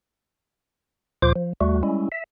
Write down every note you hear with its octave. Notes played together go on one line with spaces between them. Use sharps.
D2 A#2 F3 F4 C5 D6
F3
D#2 G3 A3 F#4
G3 G#3 C#4 E4
E5